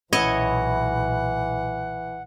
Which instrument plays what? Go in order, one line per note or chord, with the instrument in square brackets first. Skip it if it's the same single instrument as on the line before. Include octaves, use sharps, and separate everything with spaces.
[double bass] B1 A#2 [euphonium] E3 [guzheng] E4 C#5 D#5 [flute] F#5